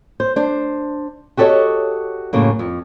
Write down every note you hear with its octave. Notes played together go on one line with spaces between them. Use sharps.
C5
D4 C5
F#4 G4 A4 B4 C#5 D#5
F#2 A2 C#3 A#3
F2